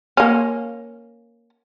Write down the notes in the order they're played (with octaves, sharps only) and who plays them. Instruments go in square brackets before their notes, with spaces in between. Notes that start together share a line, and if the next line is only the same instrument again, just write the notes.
[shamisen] A#3 C#4